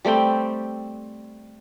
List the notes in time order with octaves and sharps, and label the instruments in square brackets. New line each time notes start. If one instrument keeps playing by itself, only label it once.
[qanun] G3 A3 C4 G5